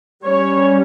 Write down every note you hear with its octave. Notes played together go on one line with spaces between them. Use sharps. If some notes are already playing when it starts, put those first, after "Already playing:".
G3 C#4 C#5